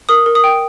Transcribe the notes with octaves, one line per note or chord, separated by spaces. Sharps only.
A#4 D#6
A#4
D#6
G5